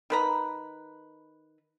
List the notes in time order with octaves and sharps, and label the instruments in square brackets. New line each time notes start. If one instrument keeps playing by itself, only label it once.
[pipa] D#3 B4 A#5